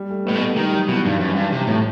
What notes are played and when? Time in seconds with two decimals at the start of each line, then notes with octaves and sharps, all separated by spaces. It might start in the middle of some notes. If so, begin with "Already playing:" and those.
Already playing: G3
0.10 A3
0.25 A2 B3
0.36 B2
0.42 A3
0.57 D#3 G3
0.73 F#3
0.88 B2 E3
1.05 G2 D#3
1.20 F#2
1.36 G2
1.52 C3
1.67 A2